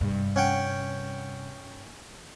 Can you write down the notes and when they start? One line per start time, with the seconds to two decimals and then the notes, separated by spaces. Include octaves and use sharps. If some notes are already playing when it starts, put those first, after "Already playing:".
0.01 G2 C3
0.36 C#4 F#5 G5